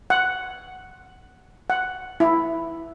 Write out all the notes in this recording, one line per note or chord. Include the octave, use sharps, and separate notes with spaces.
F#5
F#5
E4